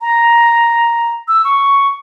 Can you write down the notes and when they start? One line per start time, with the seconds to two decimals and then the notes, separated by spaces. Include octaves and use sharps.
0.01 A#5
1.28 E6
1.45 C#6